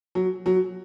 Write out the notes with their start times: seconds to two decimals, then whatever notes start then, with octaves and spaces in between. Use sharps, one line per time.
0.15 F#3
0.46 F#3